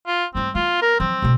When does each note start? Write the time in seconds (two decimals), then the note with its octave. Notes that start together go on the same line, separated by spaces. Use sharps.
0.07 F4
0.35 G2 A3 C4
0.55 B3 F4
0.82 A#4
1.00 F3 F#3 C4
1.22 B2 D3